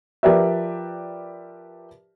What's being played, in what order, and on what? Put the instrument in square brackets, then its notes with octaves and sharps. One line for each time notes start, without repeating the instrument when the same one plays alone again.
[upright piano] F3 G4 A#4 B4 D5 E5